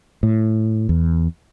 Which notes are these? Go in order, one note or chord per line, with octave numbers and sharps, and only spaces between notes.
A2
E2